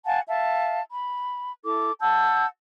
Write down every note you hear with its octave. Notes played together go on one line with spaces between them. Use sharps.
F5 F#5 G#5 A5
E5 F5 A5
B5
E4 A4 D6
F#5 A5 E6 G6